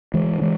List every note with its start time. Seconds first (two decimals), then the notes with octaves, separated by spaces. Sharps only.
0.14 E3 G#3
0.42 E3 G#3